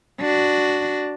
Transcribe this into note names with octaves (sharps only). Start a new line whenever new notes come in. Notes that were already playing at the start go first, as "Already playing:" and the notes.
D4 F#4